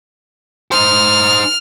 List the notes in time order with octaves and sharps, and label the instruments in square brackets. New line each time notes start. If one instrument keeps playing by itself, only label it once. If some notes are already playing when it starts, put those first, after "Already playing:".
[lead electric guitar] D#4 C5 [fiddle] F6